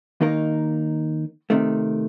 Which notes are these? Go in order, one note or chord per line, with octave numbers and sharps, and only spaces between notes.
D#2 D#3 A#3 D#4 A#4
C3 D#3 A3